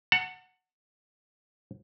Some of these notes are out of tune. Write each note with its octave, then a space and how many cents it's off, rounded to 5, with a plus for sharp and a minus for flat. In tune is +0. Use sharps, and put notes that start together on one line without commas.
F#5 +0 A5 +40